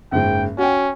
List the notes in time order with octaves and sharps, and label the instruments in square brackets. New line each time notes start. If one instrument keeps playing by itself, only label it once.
[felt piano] F#1 G#2 [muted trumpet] G5
[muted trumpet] C#4 [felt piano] F#4 G5